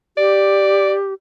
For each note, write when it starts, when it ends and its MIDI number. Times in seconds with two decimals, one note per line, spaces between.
0.17 1.14 67
0.17 0.93 74